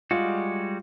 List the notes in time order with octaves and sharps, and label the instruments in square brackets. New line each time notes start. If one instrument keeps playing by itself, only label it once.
[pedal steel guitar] G3 G#3 F#4 [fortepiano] F4